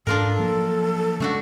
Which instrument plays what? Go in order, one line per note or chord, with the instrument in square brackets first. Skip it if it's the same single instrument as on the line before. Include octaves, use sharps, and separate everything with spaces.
[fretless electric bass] G#2 [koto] D4 F4 A#4 [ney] A4
[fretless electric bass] F3 F#3 A#3
[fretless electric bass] C#3 G#3 C#4 [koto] A3 D4 F#4